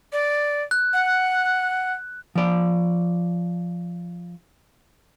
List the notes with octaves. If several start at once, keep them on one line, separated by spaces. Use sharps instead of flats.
D5
F#6
F#5
F3 D5